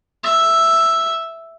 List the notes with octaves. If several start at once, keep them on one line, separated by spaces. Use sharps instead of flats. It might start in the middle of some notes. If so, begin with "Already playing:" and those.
E5